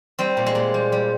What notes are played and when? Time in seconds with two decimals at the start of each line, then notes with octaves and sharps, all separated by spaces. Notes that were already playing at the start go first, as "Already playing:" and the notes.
0.19 G3 C4
0.37 A#2
0.46 G#3
0.55 A#2
0.74 G3
0.92 G3